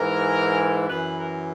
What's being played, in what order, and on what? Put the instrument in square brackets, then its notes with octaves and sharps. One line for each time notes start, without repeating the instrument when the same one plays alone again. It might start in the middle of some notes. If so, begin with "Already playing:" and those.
Already playing: [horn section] G#2 E3 A#4
F#2 E3 B4
A#4